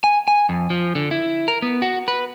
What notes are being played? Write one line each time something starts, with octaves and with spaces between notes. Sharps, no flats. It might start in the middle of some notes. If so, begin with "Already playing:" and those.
G#5
G#5
F2
F3
D3
E4
A#4
B3
F#4
B4